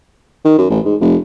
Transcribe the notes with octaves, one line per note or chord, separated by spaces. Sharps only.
D#3
F#2
A1
G#2
F1